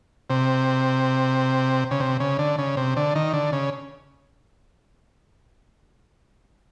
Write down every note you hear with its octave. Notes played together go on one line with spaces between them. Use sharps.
C3
C#3
C3
C#3
D3
C#3
C3
D3
D#3
D3
C#3